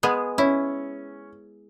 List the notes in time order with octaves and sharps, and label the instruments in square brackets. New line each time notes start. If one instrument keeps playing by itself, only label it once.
[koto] G#3 B3 G#4
[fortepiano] C#4 [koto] E4